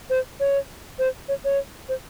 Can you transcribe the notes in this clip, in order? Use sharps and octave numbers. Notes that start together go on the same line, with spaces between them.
C5
C#5
C5
C#5
C#5
C5